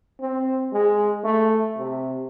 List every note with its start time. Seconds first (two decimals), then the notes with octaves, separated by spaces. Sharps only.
0.20 C4
0.73 G#3
1.24 A3
1.77 C3